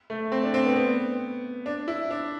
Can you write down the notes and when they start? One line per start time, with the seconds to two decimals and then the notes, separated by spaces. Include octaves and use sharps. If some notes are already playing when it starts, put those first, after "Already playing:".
0.10 A3
0.32 C4
0.43 D4
0.54 C4
0.65 B3
0.76 B3
1.66 D4
1.88 E4
2.11 D4